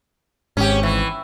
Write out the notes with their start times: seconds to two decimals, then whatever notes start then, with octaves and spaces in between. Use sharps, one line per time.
0.57 G#1 G#2 C#4 G4
0.83 E3